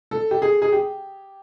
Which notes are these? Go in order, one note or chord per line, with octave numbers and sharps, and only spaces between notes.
A4
G4
G#4
G#4
G4